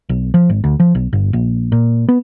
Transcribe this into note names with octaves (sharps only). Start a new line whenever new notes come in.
B1
F3
G#1
D2
F3
B1
G1
A#1
A#2
B3